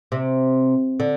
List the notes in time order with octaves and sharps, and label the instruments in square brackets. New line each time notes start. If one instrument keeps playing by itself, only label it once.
[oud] C3
D3